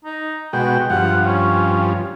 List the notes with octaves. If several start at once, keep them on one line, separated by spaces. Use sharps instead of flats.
D#4
B2 G#3 F#4 G5
G2 F3 F#5
C#4